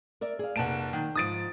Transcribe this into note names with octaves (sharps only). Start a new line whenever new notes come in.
A#4 D5 E5
G#4 F5
F1 A#3 F#5 A5 D7
D#3
G#2 F3 D#4 D#6 A6 D7